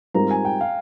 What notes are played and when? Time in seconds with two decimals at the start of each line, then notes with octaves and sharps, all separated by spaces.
0.14 G#2 G3 C4 F4 A#4 A#5
0.31 G#5
0.45 G5
0.61 F5